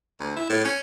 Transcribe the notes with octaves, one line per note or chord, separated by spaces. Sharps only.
D2
E4
A2
C#4